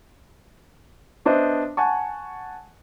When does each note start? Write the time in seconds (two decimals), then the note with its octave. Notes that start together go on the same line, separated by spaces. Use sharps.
1.25 B3 D4 C5 D#5 E5
1.77 F#5 G#5 A5 C#6